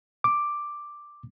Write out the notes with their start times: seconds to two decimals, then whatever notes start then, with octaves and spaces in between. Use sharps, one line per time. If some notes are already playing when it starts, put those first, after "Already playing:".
0.24 D6